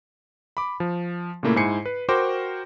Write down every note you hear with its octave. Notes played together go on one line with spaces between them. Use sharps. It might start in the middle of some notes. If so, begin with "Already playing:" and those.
B5 D6
F3
A#2 C#3 A3 A#3 E4
G#2 E4 C5 G#5 C7 C#7
B4
F#4 A#4 C5 G5 D6